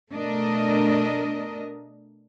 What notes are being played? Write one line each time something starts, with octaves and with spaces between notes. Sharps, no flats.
B2 A3 D4 A#4 D#5